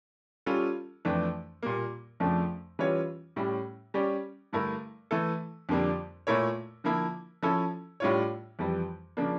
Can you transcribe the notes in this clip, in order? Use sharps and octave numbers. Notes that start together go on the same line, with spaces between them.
G3 C#4 F4 A4
F2 E3 A3 D4
A#2 G3 A#3
F2 C#3 F3 A3 D4
E3 G3 C#4 F4 C#5
A2 G3 C#4
G3 C#4 G4 D5
G2 D3 A3 E4 A#4
E3 A3 E4 A4
F2 D3 G3 A#3 D4
A#2 A3 E4 A#4 C#5
D3 F3 A#3 E4
F3 C#4 E4 A4
A2 G3 D4 F4 C#5
F2 E3 G3
C#3 F3 A#3 D4